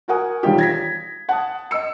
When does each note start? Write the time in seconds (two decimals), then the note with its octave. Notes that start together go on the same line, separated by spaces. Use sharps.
0.08 F#4 A#4 F#5 G#5 D#6
0.43 E1 D#3 G3 F4 G4
0.58 G#6 A#6 B6
1.29 F#5 A5 D#6
1.71 D#5 E6 C#7